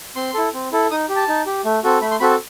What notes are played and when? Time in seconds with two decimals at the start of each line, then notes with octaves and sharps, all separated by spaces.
0.15 C4 C6
0.34 E4 A4
0.54 C4
0.72 E4 A4
0.91 D#4 D#6
1.09 G4
1.16 A5
1.28 D#4
1.46 G4
1.65 A3
1.84 C4 F#4 A4
2.01 A3 B5
2.11 C6
2.20 C4 F#4 A4 B5
2.30 A5